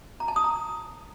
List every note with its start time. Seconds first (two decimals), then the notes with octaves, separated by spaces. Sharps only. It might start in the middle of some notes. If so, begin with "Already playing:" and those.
0.20 A#5
0.28 A5
0.36 D#6
0.44 A#5